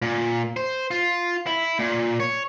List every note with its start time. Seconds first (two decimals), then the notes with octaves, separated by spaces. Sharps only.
0.02 A#2
0.57 C5
0.91 F4
1.47 E4
1.79 A#2
2.20 C#5